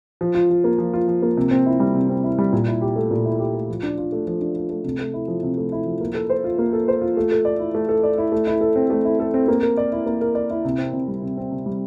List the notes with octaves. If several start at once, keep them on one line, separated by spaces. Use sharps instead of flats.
F3
F4
F3
A#3
F3
F4
F3
A#3
C3
C4
E4
G3
C3
C4
E4
G3
A#2
E4
G4
A3
A#2
E4
G4
A3
F3
D4
F4
A3
F3
D4
F4
A3
C3
A3
E4
F3
C3
A3
E4
F3
A#3
A4
C5
F4
A#3
A4
C5
F4
A3
A4
D5
E4
A3
A4
D5
E4
A3
E4
A4
C4
A3
E4
A4
C4
A#3
A#4
D5
E4
A#3
A#4
D5
E4
C3
C4
C3
G3
C3
C4
C3
G3